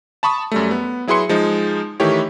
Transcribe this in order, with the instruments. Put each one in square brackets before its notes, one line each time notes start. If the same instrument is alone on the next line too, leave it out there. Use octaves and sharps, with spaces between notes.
[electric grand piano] A5 B5 C#6 D#6
F#2 G3 A3
B3
F#3 E4 G#4 B4 C6 C#7
F3 G#3 D#4
D#3 E3 A3 E4 G4 C#5